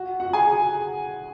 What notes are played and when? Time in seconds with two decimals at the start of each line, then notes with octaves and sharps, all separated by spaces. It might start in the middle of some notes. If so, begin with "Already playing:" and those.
Already playing: F#4
0.20 F#4 F#5
0.33 G#4 G#5